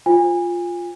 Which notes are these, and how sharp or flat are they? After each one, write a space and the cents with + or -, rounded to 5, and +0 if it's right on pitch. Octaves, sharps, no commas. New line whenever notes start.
F4 +0 C5 +0 G#5 -30